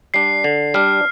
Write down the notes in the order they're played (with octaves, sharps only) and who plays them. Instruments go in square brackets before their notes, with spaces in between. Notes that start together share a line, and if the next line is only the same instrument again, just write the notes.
[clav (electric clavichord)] G3 D4 [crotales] C7
[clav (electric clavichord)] D3
[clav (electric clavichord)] G3 D4 [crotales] F6